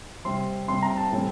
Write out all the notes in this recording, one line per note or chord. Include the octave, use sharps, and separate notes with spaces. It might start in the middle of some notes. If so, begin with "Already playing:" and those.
C3 G3 C4 C6
C3 G3 C4 C6
A#5
A5
A2 E3 G3 C4